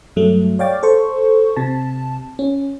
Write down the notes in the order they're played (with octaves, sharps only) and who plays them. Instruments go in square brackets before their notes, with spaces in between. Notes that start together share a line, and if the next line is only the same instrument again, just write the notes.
[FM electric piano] G2 F#3 A3
C#5 D5 F5 G5 D6 A6
A4 C5 C#6
C3 A5
C#4